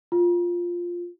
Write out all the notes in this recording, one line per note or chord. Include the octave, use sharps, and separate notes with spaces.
F4